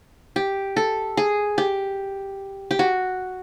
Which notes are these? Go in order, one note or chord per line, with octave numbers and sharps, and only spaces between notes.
G4
A4
G#4
G4
G4
F#4